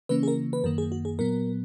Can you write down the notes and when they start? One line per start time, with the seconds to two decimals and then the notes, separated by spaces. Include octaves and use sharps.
0.09 C#3 E3 A#3 C#4 B4
0.23 G#4
0.28 A#4
0.53 B4
0.64 F#2 D#3 A#3 A#4
0.78 G#4
0.92 F#4
1.05 G#4
1.19 A#2 F#3 B3 A#4